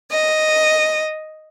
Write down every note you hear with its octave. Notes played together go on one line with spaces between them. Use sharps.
D#5